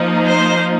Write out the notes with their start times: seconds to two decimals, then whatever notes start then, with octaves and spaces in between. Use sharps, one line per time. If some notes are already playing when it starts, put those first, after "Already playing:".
Already playing: F3 A#3 D#4
0.26 C5